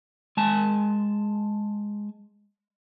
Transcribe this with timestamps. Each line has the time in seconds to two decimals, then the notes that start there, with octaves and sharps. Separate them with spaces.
0.37 G#3 G#5 A5